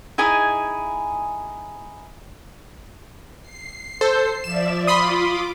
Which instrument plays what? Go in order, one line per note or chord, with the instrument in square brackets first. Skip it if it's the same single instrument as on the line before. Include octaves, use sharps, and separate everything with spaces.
[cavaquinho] D#4 E4 G#4 G#5
[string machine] C7
[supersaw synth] A4 C5
[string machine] F3 D5 E5 [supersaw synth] E7
[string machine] F4 D6 [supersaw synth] B5 C6 D#6